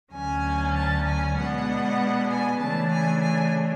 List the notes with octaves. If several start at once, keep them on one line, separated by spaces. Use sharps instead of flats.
D2 D3 F#3 C#4 G#5
A5
G#5
B2 G#3 B3 D4 F#5
G#5
C#3 E3 A3 D4 A5
G#5
G#5